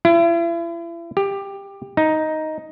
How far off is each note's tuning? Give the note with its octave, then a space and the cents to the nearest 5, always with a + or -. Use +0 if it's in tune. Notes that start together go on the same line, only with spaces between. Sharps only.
E4 +40
G4 +15
D#4 +5